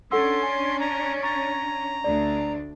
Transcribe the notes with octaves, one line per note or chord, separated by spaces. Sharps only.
C#4 D4 A4 F#5 C6 E6
G#5
A#5
A#5 C#6 A6
D2 D4 D5